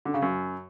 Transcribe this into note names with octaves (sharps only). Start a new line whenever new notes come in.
D3
C#3
F#2